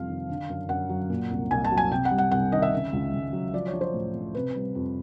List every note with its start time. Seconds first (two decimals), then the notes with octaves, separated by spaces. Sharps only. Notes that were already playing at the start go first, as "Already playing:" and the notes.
Already playing: F2 C3 F3 G3 F5
0.08 D#3
0.30 D3
0.50 F#2
0.69 F#2 F#5
0.89 F#3
1.10 A#2
1.31 C2
1.51 C2 G#5
1.64 A5
1.71 F#3
1.77 G#5
1.91 C3 G5
2.05 F#5
2.11 G3
2.18 F#5
2.31 C2 F#5
2.52 D#3 D#5
2.62 E5
2.73 C#3
2.93 C#2
3.14 C#2
3.33 F#3
3.54 F3 D5
3.67 C#5
3.73 F3
3.81 C5
3.94 A2
4.14 A2
4.35 C3 B4
4.55 G3
4.75 F2